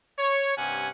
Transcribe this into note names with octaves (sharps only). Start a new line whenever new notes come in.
C#5
G2 C3 C#4 F#5 G#5